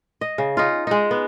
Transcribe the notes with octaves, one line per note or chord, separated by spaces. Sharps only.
D#5
C#3
D#4 F4
G#3 D#4
B3